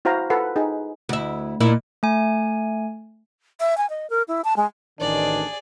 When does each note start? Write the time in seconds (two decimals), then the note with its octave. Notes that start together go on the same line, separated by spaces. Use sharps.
0.05 E4 F#4 C5 F5 A#5
0.30 F4 A4 B4 F#5
0.56 D#4 G#4
1.09 D2 E4
1.60 A#2 A#3 E4
2.03 A3 G#5
3.60 E5
3.78 G#5
3.90 D#5
4.10 A#4
4.28 E4
4.44 A5
4.57 G#3
5.00 A1 D#3 D4 G#4 D5